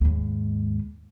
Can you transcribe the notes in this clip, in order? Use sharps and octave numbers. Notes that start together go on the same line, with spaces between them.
D#2 G#2